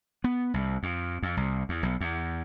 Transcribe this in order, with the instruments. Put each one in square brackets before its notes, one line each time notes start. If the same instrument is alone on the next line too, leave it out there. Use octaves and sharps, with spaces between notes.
[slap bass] B3
C2
F2
F2
C2
E2
B1
E2